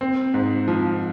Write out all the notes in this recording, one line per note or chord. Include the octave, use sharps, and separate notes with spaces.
C4
G#2
F3